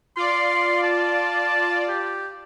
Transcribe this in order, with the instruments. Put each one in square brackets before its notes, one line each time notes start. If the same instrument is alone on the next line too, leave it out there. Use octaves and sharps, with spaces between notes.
[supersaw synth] F4 D5 [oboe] C6
[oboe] A5
G4